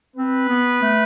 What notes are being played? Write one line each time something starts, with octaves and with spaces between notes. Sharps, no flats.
C4 B4
B3
A3